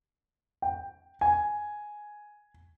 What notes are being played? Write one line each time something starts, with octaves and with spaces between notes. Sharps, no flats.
G5
G#5